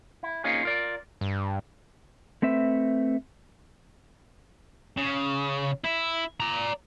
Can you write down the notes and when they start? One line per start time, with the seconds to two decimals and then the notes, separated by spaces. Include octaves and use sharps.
0.23 E4
0.44 A#3 C4 C#4 D#4 F4 G#4
0.63 F4 A#4 D5
1.21 G2
2.42 A3 C4 B4 E5
4.97 C#3
5.85 E4
6.40 D5 A#5